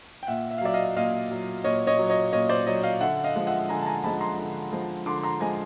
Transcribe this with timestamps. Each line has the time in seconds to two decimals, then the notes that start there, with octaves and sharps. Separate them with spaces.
0.23 G5
0.27 A#2 E5 F#5
0.51 E5
0.58 F5
0.61 F#3 D5 E5
0.74 D#5 F5
0.96 A#2 D#5 F5
1.31 F#3
1.64 A#2 C#5 D#5
1.87 C#5 D#5
1.98 F#3
2.10 C#5 D#5
2.33 A#2 C#5 D#5
2.49 C5 D5
2.66 F#3 C#5 D#5
2.83 D#5 F5
3.01 D3 E5 F#5
3.24 D#5 F5
3.36 F3 G#3
3.47 E5 F#5
3.69 D3 G#5 A#5
3.82 A5
3.86 G#5 A#5
4.04 F3 G#3 A5 B5
4.20 A#5 C6
4.37 D3
4.73 F3 G#3
5.06 D3 C6 D6
5.23 A#5 C6
5.40 F3 G#3 G#5 A#5